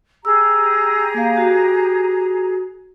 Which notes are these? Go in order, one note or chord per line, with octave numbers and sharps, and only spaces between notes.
G4 G#4 A#5 E6
A#3 F5
F#4